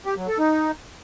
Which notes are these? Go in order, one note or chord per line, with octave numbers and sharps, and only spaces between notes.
G4
F#3
A4
D#4